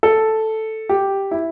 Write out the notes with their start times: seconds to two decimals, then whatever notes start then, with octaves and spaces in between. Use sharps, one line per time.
0.03 A4
0.89 G4
1.31 E4